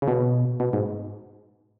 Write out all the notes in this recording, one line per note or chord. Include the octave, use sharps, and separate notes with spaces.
C#3
B2
B2
G#2